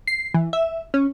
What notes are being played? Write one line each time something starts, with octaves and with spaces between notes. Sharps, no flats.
C7
E3
E5
C#4